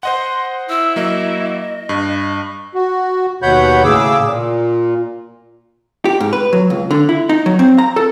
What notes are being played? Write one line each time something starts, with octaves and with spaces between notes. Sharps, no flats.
C5 D#5 F#5 C6
E4 E6
F#3 A#3 D#5
G2
F#4
D#2 B2 C#5 F#5 B5 G6
A2 C#3 G#4 D6 E6
A#2
G4
G#2
B4
F#3
C#2
D3
E4
D#4
F#3
C4
A#5
A4